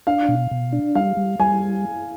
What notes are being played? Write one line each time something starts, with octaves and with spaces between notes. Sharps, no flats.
D4 F5
B2
B2
D4
G3 F5
G3
G3 G#5